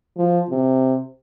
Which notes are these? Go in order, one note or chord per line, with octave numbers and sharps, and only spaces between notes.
F3
C3